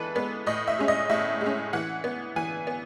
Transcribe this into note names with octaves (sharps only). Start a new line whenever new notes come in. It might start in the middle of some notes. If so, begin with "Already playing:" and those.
Already playing: E3 G#3 B3 A4 B4
G#3 B3
A2 D#5
E5
G#3 C#4
D#5
A2 E5
G#3
C#4
E3 F#5
B3
E3 G#5
B3